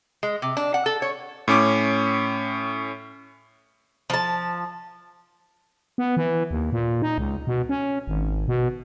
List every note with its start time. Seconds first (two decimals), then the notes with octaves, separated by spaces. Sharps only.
0.23 G#3
0.42 C3
0.57 D4
0.74 F#5
0.86 A4
1.02 C#5
1.48 A2 C#4 D6
4.10 F3 A5
5.98 B3
6.17 E3
6.51 D#2
6.73 A#2
7.02 D#4
7.18 C#2
7.47 B2
7.69 C#4
8.07 G#1
8.48 B2